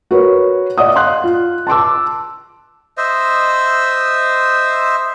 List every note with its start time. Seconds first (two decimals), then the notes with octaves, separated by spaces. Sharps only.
0.11 F#4 A#4 B4 C#5
0.78 D5 D#5 F#5 D#6
0.94 F5 F#5 C6 F#6
1.24 F4
1.67 A5 C6 D6 E6
2.98 C5 D#5 E5